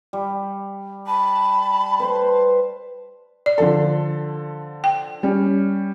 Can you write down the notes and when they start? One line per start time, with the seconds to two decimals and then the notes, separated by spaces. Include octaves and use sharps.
0.13 G3
1.07 A5 B5
2.00 B4 C5 C6
3.46 D5
3.58 D3 F3 A4
4.84 G5
5.23 G3 C#4